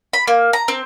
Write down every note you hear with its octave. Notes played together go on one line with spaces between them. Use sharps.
B5
A#3
A#5
C4